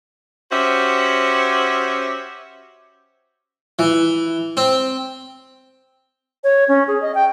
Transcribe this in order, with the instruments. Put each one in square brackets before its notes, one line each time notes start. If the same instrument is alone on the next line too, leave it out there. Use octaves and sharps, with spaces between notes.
[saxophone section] C#4 F#4 G4 C5 E5
[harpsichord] E3
C4
[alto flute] C#5
C#4
G#4
D#5
G5